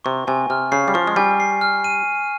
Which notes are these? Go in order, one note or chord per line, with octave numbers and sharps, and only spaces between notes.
C3 C#6
C3 G#5
C3 F6
C#3 C7
G3
F3 C#6
G#3
G3 G#5
C7
F6
D#7